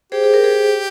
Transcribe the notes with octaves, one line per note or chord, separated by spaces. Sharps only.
G4 G#4 C5
G#4
A#4
G#4 C5